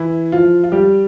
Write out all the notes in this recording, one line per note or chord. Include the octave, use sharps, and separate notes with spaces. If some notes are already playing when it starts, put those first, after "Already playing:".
Already playing: E3 E4
F3 F4
F4
G3 G4